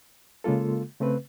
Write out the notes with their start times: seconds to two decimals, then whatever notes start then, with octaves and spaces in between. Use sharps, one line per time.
0.44 C#3 G#3 A#3 F4 A4
1.00 C#3 A3 C4 B4